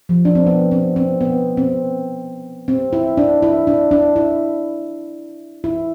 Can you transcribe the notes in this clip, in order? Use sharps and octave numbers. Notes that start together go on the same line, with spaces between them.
F3
D4
C4
B3
C4
C4
B3
C4
C4
E4
D4
E4
D4
D4
E4
E4